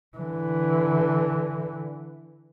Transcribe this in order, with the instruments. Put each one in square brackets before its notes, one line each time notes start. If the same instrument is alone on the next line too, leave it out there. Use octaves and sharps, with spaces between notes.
[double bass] D3 E3